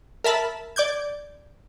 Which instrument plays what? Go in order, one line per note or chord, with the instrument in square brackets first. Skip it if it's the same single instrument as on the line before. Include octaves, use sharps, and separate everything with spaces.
[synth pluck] A#4 E5 A5 B5
D5 D6 G6 G#6